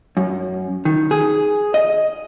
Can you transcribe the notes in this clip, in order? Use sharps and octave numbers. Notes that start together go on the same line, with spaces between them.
F#2
D#3
G#4
D#5